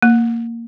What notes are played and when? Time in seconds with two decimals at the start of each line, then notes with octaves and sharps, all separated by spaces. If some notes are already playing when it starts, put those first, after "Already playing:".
0.02 A#3